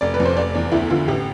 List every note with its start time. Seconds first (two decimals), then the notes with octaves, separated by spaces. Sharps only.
0.01 F1 D5
0.14 B4
0.20 F2
0.25 C5
0.37 F1 D5
0.55 E2 D5
0.72 D2 E4
0.90 D3 F4
1.08 A1 G4